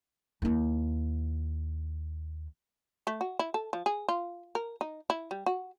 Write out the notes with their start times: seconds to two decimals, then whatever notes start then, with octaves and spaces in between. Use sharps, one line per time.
0.42 D#2 E4
3.07 A3
3.21 F#4
3.39 E4
3.54 A4
3.73 F3
3.86 G#4
4.08 F4
4.55 A#4
4.81 D#4
5.10 E4
5.31 G3
5.46 F#4